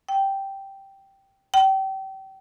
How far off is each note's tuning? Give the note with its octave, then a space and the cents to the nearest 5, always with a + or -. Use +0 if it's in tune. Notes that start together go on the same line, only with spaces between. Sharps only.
G5 -5
G5 -30